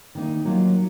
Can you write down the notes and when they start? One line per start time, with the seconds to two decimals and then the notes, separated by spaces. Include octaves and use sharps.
0.15 D#3 A#3 D#4
0.45 F#3 A#3 F4